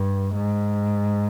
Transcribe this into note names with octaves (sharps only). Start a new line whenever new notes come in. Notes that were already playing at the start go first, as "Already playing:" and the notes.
Already playing: G2
G#2